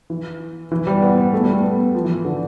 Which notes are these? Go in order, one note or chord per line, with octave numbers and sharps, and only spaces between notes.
E3
E3
G3
B3
B3
A3
G3
A3
B3
F3
E3
D3